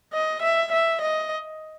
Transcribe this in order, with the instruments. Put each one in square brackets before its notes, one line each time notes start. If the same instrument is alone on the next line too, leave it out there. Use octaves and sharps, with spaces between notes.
[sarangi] D#5
E5
E5
D#5